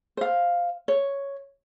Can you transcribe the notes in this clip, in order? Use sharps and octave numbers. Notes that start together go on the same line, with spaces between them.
C5 F5
C#5